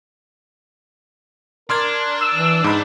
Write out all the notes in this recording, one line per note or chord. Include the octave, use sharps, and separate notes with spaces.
D4 A#4 C6 F6 G#6
E6
E3
G#2 D#4 B5